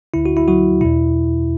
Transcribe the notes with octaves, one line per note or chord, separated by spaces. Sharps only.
D2 D3 E4
F#4
E4
F#3 F#4
E2 B2 E4